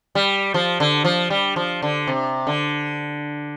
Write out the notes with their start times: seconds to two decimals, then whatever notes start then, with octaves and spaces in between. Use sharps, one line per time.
0.15 G3
0.54 F3
0.80 D3
1.05 F3
1.30 G3
1.56 F3
1.82 D3
2.07 C3
2.47 D3